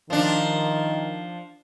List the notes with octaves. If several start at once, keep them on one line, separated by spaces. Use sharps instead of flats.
D#3 F3 D4